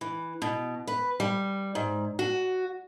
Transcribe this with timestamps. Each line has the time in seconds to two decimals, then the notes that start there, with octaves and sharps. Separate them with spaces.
0.01 E3
0.42 B2
0.87 B4
1.20 G3
1.75 G#2
2.19 F#4